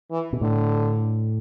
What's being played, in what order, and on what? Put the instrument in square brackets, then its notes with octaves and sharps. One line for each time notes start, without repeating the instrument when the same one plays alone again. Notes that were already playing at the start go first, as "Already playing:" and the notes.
[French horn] E3
[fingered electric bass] B2
[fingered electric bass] A2 [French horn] D3